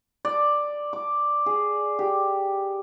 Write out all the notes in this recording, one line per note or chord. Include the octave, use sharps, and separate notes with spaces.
D5
D6
G#4
G4